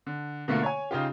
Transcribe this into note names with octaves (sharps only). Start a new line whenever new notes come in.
D3
B2 D3 A3 A#3 F4
C#5 G#5
C#3 D#4 F4 G4